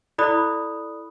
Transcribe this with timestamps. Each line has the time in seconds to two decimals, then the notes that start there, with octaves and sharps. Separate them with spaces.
0.18 E4 A4 D5 B5 D#6 F#6